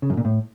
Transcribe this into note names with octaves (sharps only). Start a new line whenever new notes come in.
C#3
F#2
A#2
A2